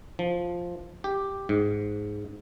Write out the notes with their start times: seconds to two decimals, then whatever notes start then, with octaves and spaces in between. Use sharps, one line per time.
0.19 F3
1.04 G4
1.49 G#2